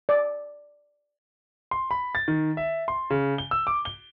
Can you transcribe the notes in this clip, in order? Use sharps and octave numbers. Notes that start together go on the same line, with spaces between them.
D5
C6
B5
A6
D#3
E5
C6
C#3
G7
E6
D6
G7